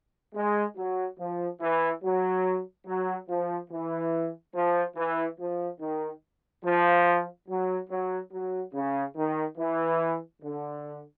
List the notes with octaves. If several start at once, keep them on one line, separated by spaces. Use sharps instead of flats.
G#3
F#3
F3
E3
F#3
F#3
F3
E3
F3
E3
F3
D#3
F3
F#3
F#3
F#3
C#3
D#3
E3
D3